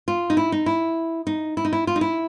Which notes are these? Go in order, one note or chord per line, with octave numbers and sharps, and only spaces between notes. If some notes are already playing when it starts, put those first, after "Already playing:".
F4
D#4
E4
D#4
E4
D#4
E4
D#4
E4
F4
D#4
E4